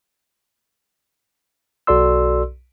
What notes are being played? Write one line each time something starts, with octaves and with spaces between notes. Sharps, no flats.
B1 F#4 A4 D5 C6 E6